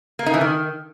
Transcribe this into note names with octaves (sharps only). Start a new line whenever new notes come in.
A#3
D#4
E3
D#3